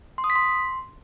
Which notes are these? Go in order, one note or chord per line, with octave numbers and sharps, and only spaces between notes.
C6
D#6
B6
C6